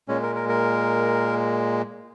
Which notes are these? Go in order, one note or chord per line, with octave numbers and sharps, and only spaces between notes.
A#2 G#3 C#4
A#4
A#4
A#4